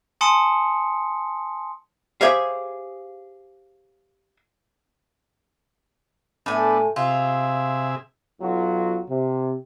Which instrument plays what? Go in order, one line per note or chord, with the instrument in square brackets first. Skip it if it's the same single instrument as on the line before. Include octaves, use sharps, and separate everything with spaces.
[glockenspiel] G#5 A5 C6 D#6 C#7
[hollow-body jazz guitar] G4 G#4 C5 C#5 E5 F5
[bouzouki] A2 G#5 [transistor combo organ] B3 D4 A4
[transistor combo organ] C3 G#4 E5 [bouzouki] F4
[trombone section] B1 F#3 F4 F#4
C3